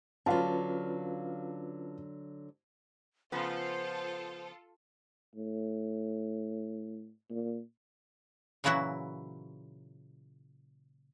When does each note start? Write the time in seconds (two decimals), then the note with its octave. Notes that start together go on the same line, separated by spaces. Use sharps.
0.26 D3 F#3 C#4 F4 B4 F5 A5
3.32 C#3 F3 B3 F4 A4 C5
5.35 A2
7.30 A#2
8.64 A#2 C#3 E3 F#3 E4 F#4